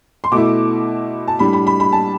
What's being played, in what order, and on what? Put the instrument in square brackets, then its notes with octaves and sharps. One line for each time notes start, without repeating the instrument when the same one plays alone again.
[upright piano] C6
B2 A3 E4 D6
A5
A2 G3 D4 B5
B5
B5
B5
A5